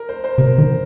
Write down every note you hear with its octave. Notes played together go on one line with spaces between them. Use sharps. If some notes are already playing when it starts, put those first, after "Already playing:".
Already playing: A#4
C5
C5
C3 A#4
D#3